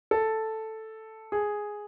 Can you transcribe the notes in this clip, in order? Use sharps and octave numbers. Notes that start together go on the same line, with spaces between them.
A4
G#4